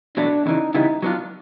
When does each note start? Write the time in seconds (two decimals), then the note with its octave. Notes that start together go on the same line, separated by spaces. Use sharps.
0.17 E2 B2 F#3 A3 D4
0.46 E2 C#3 E3 D#4
0.74 C#3 E3 G3 B3 D#4 E4
1.02 F#3 B3 D4 F4